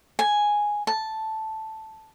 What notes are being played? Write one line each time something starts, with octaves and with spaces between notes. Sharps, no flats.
G#5
A5